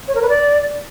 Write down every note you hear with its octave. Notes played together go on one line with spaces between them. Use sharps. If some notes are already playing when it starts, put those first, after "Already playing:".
C#5
A#4
B4
D5